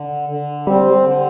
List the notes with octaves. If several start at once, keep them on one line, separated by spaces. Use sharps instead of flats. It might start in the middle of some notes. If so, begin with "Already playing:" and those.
Already playing: D3
D3
G3 C4
D3